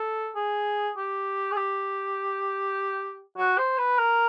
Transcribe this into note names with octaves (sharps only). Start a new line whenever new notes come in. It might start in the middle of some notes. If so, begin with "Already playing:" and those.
Already playing: A4
G#4
G4
G#4
G4
F#4
C5
B4
A#4